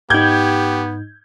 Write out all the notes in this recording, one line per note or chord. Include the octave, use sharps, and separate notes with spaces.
G#2 B3 D#4 G4 G6 G#6